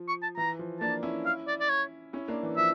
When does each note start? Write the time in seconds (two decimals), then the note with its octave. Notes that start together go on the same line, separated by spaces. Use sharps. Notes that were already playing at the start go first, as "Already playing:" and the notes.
Already playing: F3
0.08 C#6
0.23 A5
0.37 E3 A#5
0.59 F3
0.81 A#3 D4 A5
1.03 C#4 E4
1.26 F5
1.47 D5
1.60 D5
1.69 C#5
2.13 C#4 E4
2.28 A#3 D4
2.43 E3
2.57 F3 E5